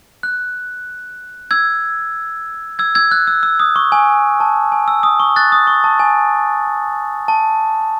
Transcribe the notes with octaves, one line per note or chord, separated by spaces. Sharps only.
F#6
E6 G#6
E6 G#6
E6 G#6
F#6
E6
E6
D#6
C#6
G#5
A5
G#5
E6
D#6
C#6
F#6 A6
D#6
C#6
A5
G#5
A5